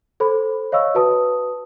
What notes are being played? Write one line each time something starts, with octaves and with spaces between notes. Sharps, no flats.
A4 C5 B5
C#5 D#5 F5 B5 C#6 E6
F#4 B4 A5 D#6